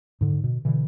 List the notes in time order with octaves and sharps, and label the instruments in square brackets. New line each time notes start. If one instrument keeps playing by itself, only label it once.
[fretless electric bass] G#2 D3
B2
B2 D3 E3